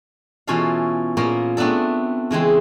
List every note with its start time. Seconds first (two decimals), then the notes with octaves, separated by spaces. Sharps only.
0.47 B2 E3 C#4 F4 A4 F5
1.17 A#2 A#3 B3 C#4
1.57 A3 B3 C4 D4 A4
2.31 C#3 E3 G#3 C4